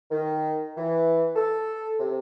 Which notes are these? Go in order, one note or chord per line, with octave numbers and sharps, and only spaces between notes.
D#3
E3
A4
C3